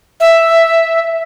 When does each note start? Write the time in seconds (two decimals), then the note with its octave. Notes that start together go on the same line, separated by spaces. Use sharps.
0.20 E5